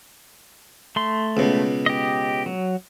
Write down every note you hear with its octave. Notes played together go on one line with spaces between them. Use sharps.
A3 C6
C#2 B2
G4 D#5
F#3